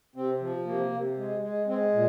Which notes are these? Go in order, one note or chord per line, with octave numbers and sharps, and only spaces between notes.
C3 C4
F3
C3 A#3
C3
G#3
G#3
G#3 C4
A#2